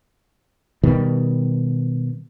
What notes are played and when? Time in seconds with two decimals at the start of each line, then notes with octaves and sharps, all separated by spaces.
0.83 B2 D#3 G3